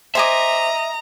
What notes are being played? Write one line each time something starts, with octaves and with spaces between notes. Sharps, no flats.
C5 D#5 E5 G#5 A#5 D6